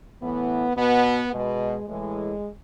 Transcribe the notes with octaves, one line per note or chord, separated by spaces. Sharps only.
A2 E3 B3
B2 B3
B2 G#3
A2 E3 G#3